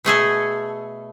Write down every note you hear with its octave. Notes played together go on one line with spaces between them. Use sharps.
B2 A3 G#4 A4